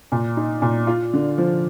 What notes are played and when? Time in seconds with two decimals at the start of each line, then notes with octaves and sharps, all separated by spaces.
0.12 A#2
0.37 D#4
0.62 A#2
0.87 F4
1.13 D3
1.38 F3